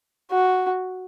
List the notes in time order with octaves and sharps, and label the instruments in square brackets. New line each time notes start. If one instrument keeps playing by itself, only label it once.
[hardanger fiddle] F#4